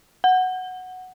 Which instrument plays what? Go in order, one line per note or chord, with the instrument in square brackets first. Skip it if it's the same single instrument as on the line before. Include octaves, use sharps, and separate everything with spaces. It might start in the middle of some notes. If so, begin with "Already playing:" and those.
[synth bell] F#5